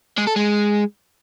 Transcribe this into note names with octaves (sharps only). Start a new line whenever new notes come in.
G#3
A4
G#3